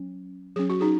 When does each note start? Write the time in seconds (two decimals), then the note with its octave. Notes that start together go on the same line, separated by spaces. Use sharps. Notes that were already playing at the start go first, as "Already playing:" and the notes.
Already playing: F#3 C#4
0.56 F#3 C#4 G#4
0.70 F#4
0.81 D#4 G#4